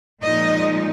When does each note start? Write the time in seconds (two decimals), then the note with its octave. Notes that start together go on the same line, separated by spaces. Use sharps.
0.23 A#2 F3 G#3 D#4 D#5